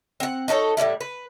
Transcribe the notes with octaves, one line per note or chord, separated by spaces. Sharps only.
C4 F#5
D#4 F#4 A4 C#5
A2 D3 G3 E4
B4